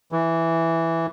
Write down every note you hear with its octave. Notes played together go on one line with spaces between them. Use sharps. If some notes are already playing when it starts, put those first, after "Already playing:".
E3